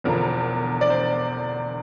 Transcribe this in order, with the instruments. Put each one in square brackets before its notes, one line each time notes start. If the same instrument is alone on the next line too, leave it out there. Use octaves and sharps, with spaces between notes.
[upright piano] E1 E2 D3 F3 A#4
D5
C5